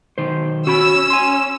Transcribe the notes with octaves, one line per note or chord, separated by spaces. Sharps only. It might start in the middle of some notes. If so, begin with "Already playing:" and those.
B1 D#3 C5
C#4 F#4 B5 E6
G#5 C6